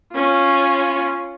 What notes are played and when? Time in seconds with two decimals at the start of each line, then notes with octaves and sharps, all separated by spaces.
0.14 C#4 F4